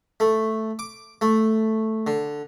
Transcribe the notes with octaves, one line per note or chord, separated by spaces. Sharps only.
A3
D6
A3
D3